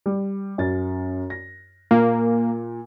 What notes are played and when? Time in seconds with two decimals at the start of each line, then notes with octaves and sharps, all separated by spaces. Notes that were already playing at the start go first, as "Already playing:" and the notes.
0.06 G3
0.58 F#2 A6
1.30 A#6
1.91 A#2 A#3